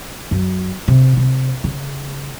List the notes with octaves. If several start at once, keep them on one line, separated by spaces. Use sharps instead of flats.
F#2
C3
C3
C#3